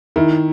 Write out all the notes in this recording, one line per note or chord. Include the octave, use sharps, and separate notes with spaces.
D#3 E4